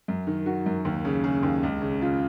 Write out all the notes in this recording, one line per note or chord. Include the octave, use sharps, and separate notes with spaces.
F#2
D#3
D#3 F#4
F#2
D#2
C#3
C#3 G#4
D#2
C#2
C#3
C#3 F4